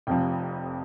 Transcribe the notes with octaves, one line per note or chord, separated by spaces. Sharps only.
F1 F2 C3 F3 G5